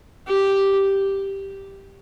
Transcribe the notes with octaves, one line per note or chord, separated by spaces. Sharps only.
G4